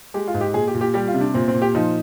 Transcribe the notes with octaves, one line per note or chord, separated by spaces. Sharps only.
G#3 G4
F4
G#2
G4
A#2 G#4
G4
A#2
G4
G3 G4
F4
C3
D4
A#2 C4
C4
A#2
G4
F3 D#4